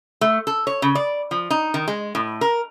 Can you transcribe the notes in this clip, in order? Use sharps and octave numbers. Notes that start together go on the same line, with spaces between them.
A3
A4
C#5
C#3
D5
F3
D#4
D#3
G#3
A2
A#4